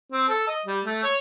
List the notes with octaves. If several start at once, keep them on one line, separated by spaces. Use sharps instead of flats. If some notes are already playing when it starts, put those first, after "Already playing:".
C4
A4
D#5
G3
A3
C#5